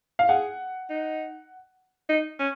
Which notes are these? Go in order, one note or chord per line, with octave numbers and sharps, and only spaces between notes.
F5
G#4 F#5
D#4
D#4
C#4